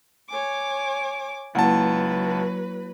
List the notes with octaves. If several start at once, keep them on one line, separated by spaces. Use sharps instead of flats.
C#5 G#5 D6
C#2 F#3 A#3 E4 B4 F#5 A5